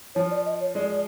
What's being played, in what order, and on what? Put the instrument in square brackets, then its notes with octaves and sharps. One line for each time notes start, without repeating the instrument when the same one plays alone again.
[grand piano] F3 [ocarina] C#5
[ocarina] D5
D#5
C#5
[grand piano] G#3 [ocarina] D5
[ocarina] D5